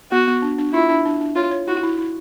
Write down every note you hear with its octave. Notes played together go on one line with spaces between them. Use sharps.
B3 F#4
B3
D4
D4
E4 F4
D4
D4
D4
F4 C#5
C#5
E4 F#4
E4
E4